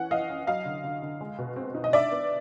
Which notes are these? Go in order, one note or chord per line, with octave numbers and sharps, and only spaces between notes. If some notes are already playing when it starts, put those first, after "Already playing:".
Already playing: E3 C#4 F#5
E3 D#5 F5
C#4
F#3 D#5 F5
D3
D3
D3
G#3
B2
C4
D#4
D#5
D4 D5 E5
B3